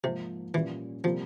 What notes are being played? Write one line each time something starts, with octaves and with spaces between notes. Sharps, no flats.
G#2 C3 F3 A#3 F4
A#2 E3 G3 C#4 F4
C3 F3 G3 A#3